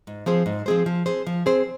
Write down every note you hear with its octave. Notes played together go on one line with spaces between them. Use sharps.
G#2
F3 C4 G#4 C5
G#2
F3 C4 G#4 C5
F3
C4 G#4 C5
F3
C4 G#4 C5